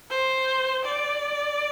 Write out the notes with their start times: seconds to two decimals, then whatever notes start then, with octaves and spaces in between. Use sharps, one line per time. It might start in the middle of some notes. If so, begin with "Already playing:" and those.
0.10 C5
0.84 D5